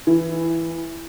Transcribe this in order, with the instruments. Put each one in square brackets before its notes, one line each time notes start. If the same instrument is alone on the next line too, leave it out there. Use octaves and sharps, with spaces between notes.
[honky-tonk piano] E3